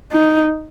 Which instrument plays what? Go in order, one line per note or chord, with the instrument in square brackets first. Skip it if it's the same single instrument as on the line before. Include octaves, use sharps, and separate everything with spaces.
[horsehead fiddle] D#4